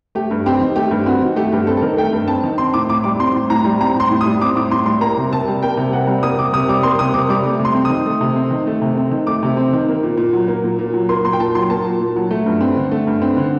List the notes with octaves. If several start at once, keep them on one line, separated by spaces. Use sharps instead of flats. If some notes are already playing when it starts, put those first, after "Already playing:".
A3 G4
G2
C4 G4
D#3
A3 G4
G2
C4 F#4
D#3
A3 G4
G2 G4
C4 A4
A4
D#3 A#4
A3 G5
G2
C4 A5
D#3
C4 C6
A2 D6
A2 D6
G3 D6
C4 C6
A2
A2 A#5
G3
C4 A#5
A2
C6
A2
D#6
G3
C4 D6
A2 D6
A2 C6
G3 C6
A#3 A#5
C3
C3 A5
G3
A#3 G5
C3
C3 F#5
G3
A#3 D#6
C3 D6
C3 D#6
G3 D6
A#3 C6
C3 D#6
C3 D6
G3 D6
A3
C3
C6
C4
D#3 D#6
A3
C3
C4
D#3
A3
C3
C4
D#3
A3 D6
C3
C4
D#3
A#3
A#2
A#2
F#3
A#3
A#2
A#2
F#3
A#3 C6
A#2 C6
G5
A#2 A5
F#3 C6
A#3 A5
A#2
A#2
F#3
A3
G2
C4
D3
A3
G2
C4
D3